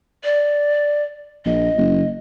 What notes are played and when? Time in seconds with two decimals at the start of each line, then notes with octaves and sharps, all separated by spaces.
0.24 D5
1.46 A#1 D#5
1.77 F#1